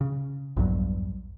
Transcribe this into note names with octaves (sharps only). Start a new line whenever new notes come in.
C#3
A#1 E2 G2 F#3